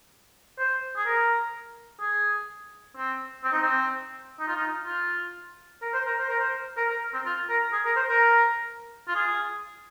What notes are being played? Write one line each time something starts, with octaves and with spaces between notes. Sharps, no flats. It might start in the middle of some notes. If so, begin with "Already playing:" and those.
C5
G#4
A#4
G#4
C4
C4
D#4
C4
D#4
F4
D#4
F4
A#4
C5
A#4
C5
A#4
C5
A#4
A#4
C4
F4
A#4
G#4
A#4
C5
A#4
F4
G#4